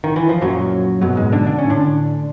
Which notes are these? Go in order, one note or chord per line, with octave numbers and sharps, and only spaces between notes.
D#3
E3
F3
F#2 A#2 F#3
F#2 B2 F#3
G#2 G#3
D3 D4
D4
A2 C#4
D3 D4